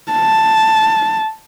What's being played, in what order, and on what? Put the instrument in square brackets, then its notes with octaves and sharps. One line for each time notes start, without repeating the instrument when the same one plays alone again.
[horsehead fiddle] A5